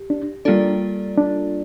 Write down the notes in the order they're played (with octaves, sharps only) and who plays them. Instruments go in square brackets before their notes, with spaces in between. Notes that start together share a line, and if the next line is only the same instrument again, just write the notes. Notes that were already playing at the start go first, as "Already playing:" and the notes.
Already playing: [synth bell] G4
[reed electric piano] D4
[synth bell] G3 A#3 F4 A4 D5 [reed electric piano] D4
[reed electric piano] D4